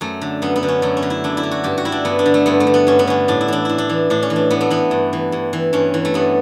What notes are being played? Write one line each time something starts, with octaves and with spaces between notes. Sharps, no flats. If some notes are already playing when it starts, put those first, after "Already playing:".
F#2 A3
D3
F#2 B3
B3
D3
C#4
F#2 A3
C#4
D3
E4
F#2 D4
E4
D3
F#4
G2 G4
F#4
D3 E4
D4
G2 B3
D4
D3
A3
G2 B3
A3
D3
B3
G2 C#4
B3
D3 C#4
A2 D4
E4
E3 D4
A2 E4
D4
E3
A2 D4
C#4
E3
D4
A2 B3
A3
E3 B3
G2
E3
G2
E3
G2 C#4
E3
A3
G2 B3